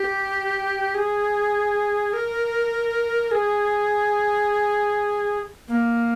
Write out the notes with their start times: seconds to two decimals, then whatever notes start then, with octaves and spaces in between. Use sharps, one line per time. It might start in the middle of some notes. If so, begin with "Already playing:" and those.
Already playing: G4
0.95 G#4
2.13 A#4
3.31 G#4
5.68 A#3